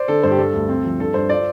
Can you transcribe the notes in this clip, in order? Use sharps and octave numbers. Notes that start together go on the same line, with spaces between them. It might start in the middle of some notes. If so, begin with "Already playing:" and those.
Already playing: C5 D5
D3 A4
G2 C5
G4
G3 A4
D2
C4
F3
G2 A4
G2 C5
F4 D5